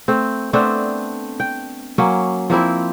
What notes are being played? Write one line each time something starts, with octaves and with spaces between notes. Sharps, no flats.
A3 C4
A3 B3 C4 D4
G5
F#3 A#3 C#4
F3 A#3 C4 E4